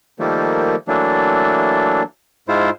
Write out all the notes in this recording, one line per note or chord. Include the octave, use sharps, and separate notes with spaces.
D#3 F3 G3 A3 A#3
E3 F#3 A3 A#3 D4
G#2 G#3 E4 F4 C5